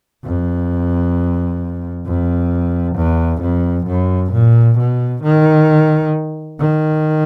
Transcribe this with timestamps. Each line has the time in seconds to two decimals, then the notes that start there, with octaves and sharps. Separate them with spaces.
0.25 F2
2.06 F2
2.96 E2
3.42 F2
3.87 F#2
4.32 A#2
4.78 B2
5.23 D#3
6.59 D#3